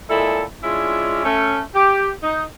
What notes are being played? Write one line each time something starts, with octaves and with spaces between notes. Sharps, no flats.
A#2 G#3 E4 A4
G#3 C#4 D4 E4 F4
A3 C#4
G4
D#4